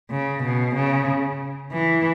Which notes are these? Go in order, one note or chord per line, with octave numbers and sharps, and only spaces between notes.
C#3
B2
C#3
E3